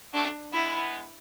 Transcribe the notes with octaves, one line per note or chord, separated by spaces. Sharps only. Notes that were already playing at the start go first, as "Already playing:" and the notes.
F#3 A3 D4
G#3 B3 E4